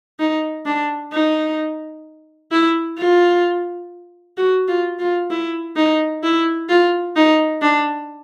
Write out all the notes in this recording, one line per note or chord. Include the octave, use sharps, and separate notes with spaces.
D#4
D4
D#4
E4
F4
F#4
F4
F4
E4
D#4
E4
F4
D#4
D4